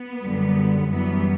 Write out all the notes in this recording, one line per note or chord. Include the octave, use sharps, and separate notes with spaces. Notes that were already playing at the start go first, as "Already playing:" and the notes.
Already playing: B3
F#2 D3 G3
F#2 E3 G3 B3